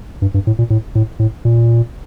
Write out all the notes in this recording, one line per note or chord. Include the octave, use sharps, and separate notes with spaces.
G2
G2
A2
A#2
A2
A2
A2
A#2